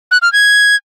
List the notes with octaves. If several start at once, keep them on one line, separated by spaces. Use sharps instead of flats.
F#6
F6
G#6